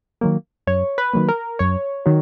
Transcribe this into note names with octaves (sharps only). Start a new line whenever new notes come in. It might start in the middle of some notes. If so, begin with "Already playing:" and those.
D#3 F#3 A#3
F#2 C#5
B4
D#3 F#3 A#3
A#4
F#2 C#5
D#3 F#3